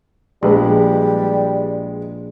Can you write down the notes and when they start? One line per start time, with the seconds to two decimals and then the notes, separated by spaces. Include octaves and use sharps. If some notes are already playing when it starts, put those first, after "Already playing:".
0.43 A#1 G3 G#3 B4